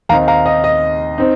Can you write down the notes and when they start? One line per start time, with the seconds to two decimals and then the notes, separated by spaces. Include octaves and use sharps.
0.09 D#2 D#3 C4 D#4 F5 A#5
0.28 F5 A#5
0.46 D#5
0.64 D#5
1.18 C4 D#4